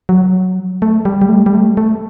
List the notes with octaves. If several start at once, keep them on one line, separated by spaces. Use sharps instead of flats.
F#3
A3
G3
G3
A3
G3
A3
A3